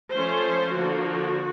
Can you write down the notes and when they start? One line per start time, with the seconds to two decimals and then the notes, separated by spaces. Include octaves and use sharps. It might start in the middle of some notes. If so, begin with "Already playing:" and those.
0.13 F3 A3 C#4 C5
0.75 D3 F3 A#3 F#4